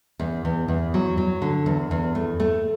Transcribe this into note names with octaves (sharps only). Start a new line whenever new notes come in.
E2
E2
E2
F#3
F#3
D3
E2
E2
A3
A3